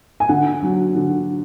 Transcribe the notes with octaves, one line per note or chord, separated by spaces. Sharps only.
G#5
D3 F#5
F#3
D3